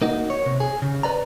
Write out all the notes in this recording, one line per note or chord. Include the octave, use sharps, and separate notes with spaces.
A#3 D#4 F#4
C#5
C3
G#4
C#3
B4 D5 A#5